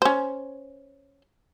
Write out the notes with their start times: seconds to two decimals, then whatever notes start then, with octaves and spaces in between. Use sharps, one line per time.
0.02 C#4 C5